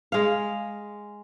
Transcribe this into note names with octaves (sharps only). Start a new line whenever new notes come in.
G#3 F5